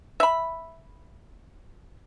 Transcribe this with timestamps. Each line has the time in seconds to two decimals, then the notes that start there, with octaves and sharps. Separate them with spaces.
0.20 E5 B5